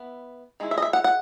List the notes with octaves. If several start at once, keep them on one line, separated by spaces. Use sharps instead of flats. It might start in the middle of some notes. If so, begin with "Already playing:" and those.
Already playing: B3 E4
D#3 G#3 E4
E5
D#5
E5
F#5
F#5